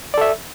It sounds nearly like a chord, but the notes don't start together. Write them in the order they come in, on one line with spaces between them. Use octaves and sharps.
D5 A4 E5